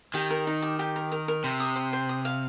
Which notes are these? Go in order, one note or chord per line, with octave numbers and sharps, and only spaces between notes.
D#3 G4
A#4
D#4
G4
G4
A#4
A#4
A#4
C3 C5
D#6
C5
C5
D#6
F5